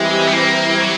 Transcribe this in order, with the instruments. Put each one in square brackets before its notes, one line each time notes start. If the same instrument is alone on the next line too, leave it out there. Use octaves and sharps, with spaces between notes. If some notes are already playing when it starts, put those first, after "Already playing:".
Already playing: [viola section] E3 G3 C4 E4 G4 [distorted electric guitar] G#3
[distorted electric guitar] B3
A#3
F#3